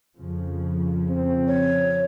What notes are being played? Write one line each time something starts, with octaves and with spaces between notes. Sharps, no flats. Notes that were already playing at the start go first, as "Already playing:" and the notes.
F2 C#3 F3
C4
C#5